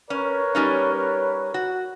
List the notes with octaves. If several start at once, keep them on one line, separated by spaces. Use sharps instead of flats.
C#4 A#4 B4 C#5
G3 C#4 D#4
F#4